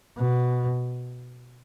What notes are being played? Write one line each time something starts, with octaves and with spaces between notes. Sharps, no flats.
B2